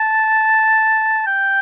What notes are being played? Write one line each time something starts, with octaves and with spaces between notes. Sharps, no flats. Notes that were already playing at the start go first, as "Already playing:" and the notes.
Already playing: A5
G5